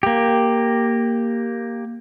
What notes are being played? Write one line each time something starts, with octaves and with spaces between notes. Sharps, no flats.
A#3 G4